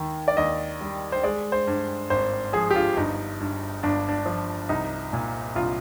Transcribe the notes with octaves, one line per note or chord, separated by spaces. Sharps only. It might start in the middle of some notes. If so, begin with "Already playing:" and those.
Already playing: D#2 D#3
D5
D#2 D#5
G3
C5
G#3 D5
C5
G2
G#1 C5
F3 G#4
G4
F4
G1 D#4
G2
G1 D4
D4
F3
C2 D#4
A#2
C2 F4